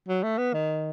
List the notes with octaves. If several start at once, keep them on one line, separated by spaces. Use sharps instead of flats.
F#3
A3
B3
D#3